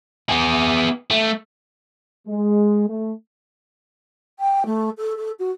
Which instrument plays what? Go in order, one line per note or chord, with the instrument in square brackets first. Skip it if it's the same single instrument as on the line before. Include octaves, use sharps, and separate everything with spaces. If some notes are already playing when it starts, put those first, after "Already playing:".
[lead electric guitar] B3 G#4
A3
[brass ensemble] G#3
A3
[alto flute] G5
A3
A4
A4
F#4